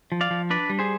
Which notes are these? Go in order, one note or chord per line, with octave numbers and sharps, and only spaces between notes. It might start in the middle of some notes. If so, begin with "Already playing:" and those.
F3
D5 F5
F3
D4 B4 D5
G3
G#4 C5